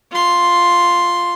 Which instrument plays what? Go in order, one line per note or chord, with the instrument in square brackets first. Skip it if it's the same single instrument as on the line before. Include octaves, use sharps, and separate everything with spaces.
[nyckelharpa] F4 C6